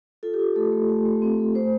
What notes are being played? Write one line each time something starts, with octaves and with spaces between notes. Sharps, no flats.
F4 A4
G4
F4
A3 A4
A3
A3
A3
C4
A3
A3 C5